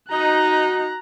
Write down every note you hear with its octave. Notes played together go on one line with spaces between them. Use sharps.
D#4 F#4 A#5 F#6